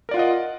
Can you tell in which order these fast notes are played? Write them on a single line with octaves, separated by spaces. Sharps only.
A#4 D5 F4 F#5 D#5